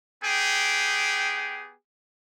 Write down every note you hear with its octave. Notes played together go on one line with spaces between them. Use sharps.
B3 G4 G#4 G5